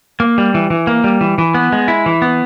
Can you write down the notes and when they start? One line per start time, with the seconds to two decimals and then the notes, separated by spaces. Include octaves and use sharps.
0.20 A#3
0.38 G3
0.54 E3
0.70 E3
0.87 A#3
1.04 G3
1.21 E3
1.38 E3
1.54 B3
1.72 G#3
1.88 E4
2.06 E3
2.22 B3